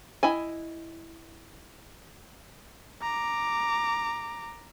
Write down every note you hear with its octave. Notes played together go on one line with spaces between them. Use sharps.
E4 D#5 G#5
A#5 D6